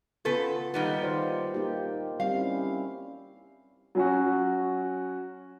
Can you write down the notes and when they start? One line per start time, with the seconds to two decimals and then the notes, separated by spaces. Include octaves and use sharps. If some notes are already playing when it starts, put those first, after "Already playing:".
0.25 C#3 B3 F4 A4 B4
0.74 D#3 G3 A#3 B3 D#4 F5
1.02 F4 C5 D5
1.54 A#3 D#4 G4
2.20 G3 C4 F5
2.34 C#4 E4
3.95 F#3 C#4 F#4